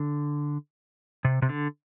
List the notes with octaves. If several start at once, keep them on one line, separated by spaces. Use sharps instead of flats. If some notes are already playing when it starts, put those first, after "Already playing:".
Already playing: D3
C3
C3
D3